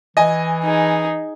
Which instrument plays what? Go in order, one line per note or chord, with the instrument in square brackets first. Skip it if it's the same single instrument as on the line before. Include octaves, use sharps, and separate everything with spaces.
[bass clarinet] E3 [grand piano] D#5 G#5
[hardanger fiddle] D#4 G#4